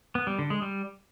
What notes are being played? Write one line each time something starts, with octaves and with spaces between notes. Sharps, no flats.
B3
G3
D3
G#3
G3